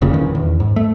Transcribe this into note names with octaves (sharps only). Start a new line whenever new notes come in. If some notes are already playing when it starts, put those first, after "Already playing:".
F1 A#2 C#3
D#1 D#3 E3 C#4
E2
G#2
A3